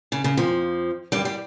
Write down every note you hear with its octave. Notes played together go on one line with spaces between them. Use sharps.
C#3
C#3
F2 F3
G2 G3
G3